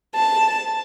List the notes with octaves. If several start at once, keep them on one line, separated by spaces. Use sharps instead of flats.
A5